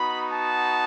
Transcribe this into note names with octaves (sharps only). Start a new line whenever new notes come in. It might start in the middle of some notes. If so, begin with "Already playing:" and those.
Already playing: B3 D#4 F#4 B5
A5